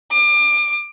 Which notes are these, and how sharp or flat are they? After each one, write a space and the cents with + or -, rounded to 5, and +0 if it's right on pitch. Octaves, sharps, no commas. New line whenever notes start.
D6 +30